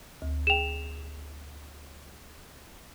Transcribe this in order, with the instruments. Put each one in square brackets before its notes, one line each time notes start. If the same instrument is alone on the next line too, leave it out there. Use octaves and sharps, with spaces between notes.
[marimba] D2
[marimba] G#4 G5 [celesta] E7 F7